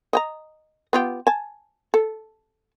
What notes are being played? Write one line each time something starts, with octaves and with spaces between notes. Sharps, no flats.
D#5 G5 A#5
B3 F4 G4
G#5 A5
A4